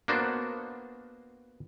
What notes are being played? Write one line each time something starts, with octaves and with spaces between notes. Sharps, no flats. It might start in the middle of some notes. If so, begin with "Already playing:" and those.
A#3 B3 D4 F#4 C5